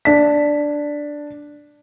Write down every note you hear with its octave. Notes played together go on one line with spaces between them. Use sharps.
D4 B6